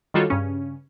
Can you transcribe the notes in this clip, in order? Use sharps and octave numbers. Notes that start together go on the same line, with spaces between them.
D#3 G3 F4 F#4 A4 C#5
G2 C#3 C#4